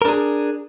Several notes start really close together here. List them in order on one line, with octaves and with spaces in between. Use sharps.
A#4 D4 G#4